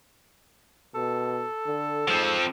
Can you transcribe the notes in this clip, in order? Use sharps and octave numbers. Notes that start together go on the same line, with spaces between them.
B2 A4
D3
G#2 F3 C4